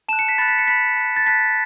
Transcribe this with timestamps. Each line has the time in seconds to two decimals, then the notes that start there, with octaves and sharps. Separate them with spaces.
0.09 A5 E7
0.13 F#6
0.19 C#7
0.29 B6
0.38 B5 F#6 A6
0.48 B6
0.58 C#7
0.67 B5 F#6 B6
0.97 A5 F#6
1.16 A6
1.26 A5 F#6 B6